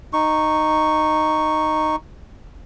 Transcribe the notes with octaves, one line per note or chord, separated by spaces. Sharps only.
D#4 C#6